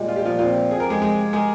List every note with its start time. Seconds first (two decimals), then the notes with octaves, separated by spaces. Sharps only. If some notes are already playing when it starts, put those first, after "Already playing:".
Already playing: A#2 G3 G#3 G4
0.08 F4
0.16 G4
0.25 F3 F4
0.39 F3 C4 F4
0.71 G#4
0.80 A#4
0.87 G#3 G4 G#4
1.02 G#3 G#4
1.33 G#3 G#4 A#4